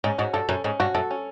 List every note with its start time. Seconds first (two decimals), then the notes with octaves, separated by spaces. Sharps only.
0.04 G#2 C#4
0.18 G#2 F#4
0.34 G2 A4
0.49 F#2 C#4
0.64 G#2 C#4
0.80 G2 F#4
0.95 F#2 A4
1.11 C#4